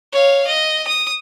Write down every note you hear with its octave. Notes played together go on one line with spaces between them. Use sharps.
C#5 F5
D#5
D#6